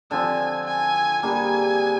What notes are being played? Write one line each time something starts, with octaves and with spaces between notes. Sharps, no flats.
D3 F3 C4 G#5
G#5
G3 A#3 D4 G#4 G#5